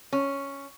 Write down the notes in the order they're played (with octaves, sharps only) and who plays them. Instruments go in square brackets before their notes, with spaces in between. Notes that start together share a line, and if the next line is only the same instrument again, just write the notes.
[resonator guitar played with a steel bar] C#4